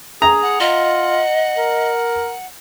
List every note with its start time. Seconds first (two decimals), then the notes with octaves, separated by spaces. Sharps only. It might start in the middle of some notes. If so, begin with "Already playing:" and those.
0.22 G#4 A#5
0.42 F#5
0.60 F4 D#5
1.58 A#4